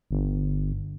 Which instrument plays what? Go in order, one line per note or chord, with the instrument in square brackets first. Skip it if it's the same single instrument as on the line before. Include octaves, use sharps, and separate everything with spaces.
[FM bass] G1